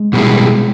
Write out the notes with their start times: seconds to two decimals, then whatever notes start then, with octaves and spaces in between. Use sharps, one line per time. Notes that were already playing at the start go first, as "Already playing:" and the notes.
Already playing: G#3
0.13 B2 G3 B3 E4 G#4